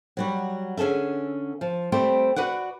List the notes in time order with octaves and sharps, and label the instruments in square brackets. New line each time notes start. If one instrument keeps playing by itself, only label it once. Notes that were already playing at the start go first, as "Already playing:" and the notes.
[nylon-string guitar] F#3 G3 F#4
D3 C#4 G#4 A4 E5
F3
G3 A3 C4 G4 C5
F#4 B4 D5 F#5